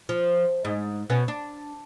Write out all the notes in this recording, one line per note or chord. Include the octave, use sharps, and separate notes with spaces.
F3
G#2
B2 B3 C#4
D4